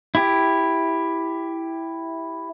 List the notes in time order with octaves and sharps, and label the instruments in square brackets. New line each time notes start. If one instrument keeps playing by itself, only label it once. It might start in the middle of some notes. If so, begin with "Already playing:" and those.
[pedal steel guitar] E4 G4